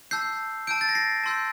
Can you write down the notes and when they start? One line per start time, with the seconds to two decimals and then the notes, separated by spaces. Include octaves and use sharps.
0.11 A5 E6 G6 C7
0.67 A5 E6 G6 D7
0.81 A6
0.89 A#6
0.95 C7
1.24 A5 C6 E6 G6